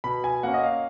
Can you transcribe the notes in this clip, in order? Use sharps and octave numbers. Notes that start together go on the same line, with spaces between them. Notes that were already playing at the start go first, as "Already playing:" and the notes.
B2 B5
G#5
A#3 C#4 F#5
D#5
F5